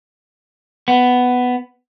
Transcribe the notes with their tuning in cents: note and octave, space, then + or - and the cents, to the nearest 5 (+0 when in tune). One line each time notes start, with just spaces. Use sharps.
B3 +10